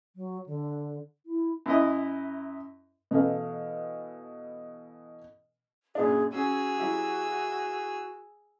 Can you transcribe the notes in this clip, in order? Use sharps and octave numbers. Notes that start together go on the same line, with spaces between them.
F#3
D3
E4
F#2 E4 D#5
B2 E3 A3 D#5 F5
F#2 A#2 D4 G#4
C#4 F#4 G#4 E6
F#3 E4 G4